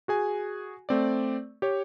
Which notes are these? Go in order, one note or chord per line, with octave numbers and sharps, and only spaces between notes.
F#4 G#4 G#5
A3 C4 D5
G4 C#5